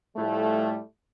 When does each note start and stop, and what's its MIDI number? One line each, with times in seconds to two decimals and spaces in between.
0.17 0.79 45
0.17 0.79 53
0.17 0.79 55
0.17 0.79 57